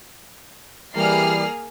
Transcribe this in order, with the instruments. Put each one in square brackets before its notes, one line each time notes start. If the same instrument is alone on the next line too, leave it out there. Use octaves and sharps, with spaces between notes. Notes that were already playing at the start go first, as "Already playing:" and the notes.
[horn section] E3 G3 [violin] A#3 G#4 [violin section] F6 C7